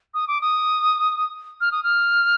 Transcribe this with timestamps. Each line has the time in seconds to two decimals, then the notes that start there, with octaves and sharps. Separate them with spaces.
0.14 D#6
0.28 D6
0.41 D#6
1.61 F6
1.72 D#6
1.83 F6